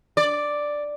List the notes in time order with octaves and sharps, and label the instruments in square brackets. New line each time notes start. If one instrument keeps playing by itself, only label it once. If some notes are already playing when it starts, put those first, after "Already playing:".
[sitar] D5